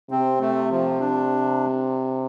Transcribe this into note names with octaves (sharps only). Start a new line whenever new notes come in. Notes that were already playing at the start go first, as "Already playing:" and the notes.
C3 C4
A3
F3
D4